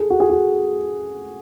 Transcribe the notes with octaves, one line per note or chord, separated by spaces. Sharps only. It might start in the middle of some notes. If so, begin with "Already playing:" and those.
Already playing: G#4 A4
F#4
G#4
F#4